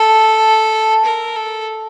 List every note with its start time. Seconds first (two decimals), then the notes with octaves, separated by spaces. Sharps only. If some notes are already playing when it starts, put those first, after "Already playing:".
Already playing: A4
1.05 A#4
1.36 A4